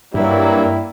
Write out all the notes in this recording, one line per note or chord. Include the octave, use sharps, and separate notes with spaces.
G2 F#3 G3 A#3 E4